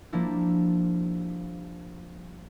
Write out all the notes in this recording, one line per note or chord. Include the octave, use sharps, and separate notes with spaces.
F3 G3 A#3 D4 E4